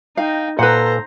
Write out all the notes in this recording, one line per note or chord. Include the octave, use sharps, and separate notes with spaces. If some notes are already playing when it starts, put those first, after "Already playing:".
D#4 F5 G5
A#2 A4 B4 C5 F#5 A#5